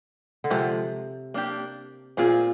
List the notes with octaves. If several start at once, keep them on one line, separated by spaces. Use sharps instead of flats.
D3
C3 F3 G#3
A#3 D4 G4
A#2 C4 F4 G#4